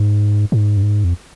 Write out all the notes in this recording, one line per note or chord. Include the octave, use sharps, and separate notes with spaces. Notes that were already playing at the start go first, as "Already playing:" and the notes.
Already playing: G#2
G#2
G2
G#2
F2